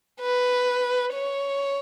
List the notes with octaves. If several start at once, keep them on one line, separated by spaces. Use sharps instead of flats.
B4
C#5